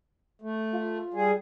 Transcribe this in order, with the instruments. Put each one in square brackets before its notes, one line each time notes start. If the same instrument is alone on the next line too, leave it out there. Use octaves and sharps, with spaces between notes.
[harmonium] A3
[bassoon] F4
[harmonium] G3 G#4